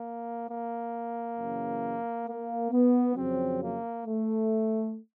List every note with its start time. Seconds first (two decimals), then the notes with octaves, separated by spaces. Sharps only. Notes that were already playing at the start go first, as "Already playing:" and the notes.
Already playing: A#3
0.48 A#3
1.37 F#2 C#3 E3
2.27 A#3
2.71 B3
3.15 F2 C#3 F#3 C4
3.61 A#3
4.05 A3